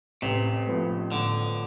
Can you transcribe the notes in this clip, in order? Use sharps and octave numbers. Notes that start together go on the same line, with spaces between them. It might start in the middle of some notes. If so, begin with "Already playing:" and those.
A1 C3
A2 F3 B3
A1 D3